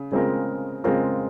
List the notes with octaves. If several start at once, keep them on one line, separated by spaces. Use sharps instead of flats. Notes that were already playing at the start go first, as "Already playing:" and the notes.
Already playing: C#3
C#3 G#3 C4 F4 A#4
C#3 G#3 C4 F4 A#4